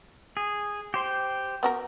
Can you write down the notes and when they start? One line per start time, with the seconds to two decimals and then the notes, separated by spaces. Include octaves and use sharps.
0.37 G#4
0.94 G4 C5 C6
1.63 B3 F#4 A#4